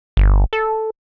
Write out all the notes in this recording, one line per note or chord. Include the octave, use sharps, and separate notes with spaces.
G1
A4